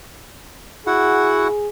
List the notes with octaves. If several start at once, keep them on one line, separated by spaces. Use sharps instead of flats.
E4 F#4 G#4 F#5